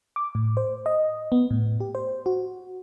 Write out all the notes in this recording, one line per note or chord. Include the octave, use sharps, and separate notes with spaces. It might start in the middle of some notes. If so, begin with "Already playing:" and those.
D6
A2
C5
D#5
B3
A2
G4
C5
F#4